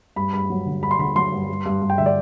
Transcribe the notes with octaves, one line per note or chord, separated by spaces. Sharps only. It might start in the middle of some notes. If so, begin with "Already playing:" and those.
G2 B5
G2 B5
F#3
D3
G2 B5
C6
D3 B5
F#3 C6
G2
G2
G2
G2
G5
D3 E5
D5